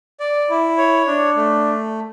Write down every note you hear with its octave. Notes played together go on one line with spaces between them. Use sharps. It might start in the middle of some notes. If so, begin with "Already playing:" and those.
D5
E4
C#5
D4
A3